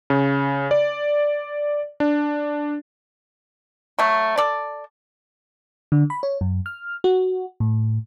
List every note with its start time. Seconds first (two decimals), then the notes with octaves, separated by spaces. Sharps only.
0.10 C#3
0.71 D5
2.00 D4
3.99 F#3 A3
4.38 A4 D5
5.92 D3
6.10 B5
6.23 C#5
6.41 F#2
6.66 F6
7.04 F#4
7.60 A2